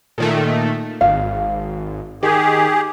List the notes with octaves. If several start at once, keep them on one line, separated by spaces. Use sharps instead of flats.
A#2 D#3 A3
G#1 F5
D#3 G4 G#4